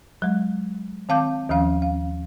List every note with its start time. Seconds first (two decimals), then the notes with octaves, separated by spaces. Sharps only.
0.22 F#3 G#3
1.09 D#3 C4 F5 A5 D6 G6
1.49 D#2 D#3 F3 C#4 F5
1.82 F5